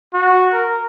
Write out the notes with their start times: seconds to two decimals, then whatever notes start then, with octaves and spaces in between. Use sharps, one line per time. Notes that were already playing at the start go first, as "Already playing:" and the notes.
0.14 F#4
0.53 A#4